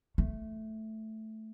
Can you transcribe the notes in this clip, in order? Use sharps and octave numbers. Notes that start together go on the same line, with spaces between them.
A3